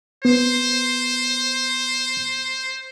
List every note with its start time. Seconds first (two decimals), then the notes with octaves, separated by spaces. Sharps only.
0.25 B3 C5